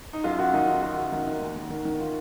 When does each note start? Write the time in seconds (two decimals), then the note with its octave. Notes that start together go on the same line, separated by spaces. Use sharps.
0.13 D#4
0.24 F#2 F4
0.39 F#2 F#4
0.53 D#3 D#4
0.68 D#3 F4
0.82 F#2 F#4
0.97 F#2
1.12 D#3
1.27 D#3
1.41 D#2
1.56 D#2
1.70 D#3
1.85 D#3
2.00 F4